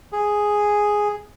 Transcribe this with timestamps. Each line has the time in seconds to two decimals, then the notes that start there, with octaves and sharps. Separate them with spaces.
0.12 G#4